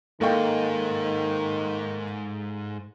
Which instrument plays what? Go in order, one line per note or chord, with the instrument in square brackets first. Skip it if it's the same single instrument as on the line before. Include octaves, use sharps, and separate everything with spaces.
[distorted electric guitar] G#2 [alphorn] D#3 [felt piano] A#3 D#5 G5 [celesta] A4 F5 C#6